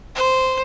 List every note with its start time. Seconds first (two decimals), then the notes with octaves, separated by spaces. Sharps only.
0.15 C5